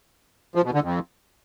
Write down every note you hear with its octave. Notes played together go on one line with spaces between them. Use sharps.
F3
B2
D3
F2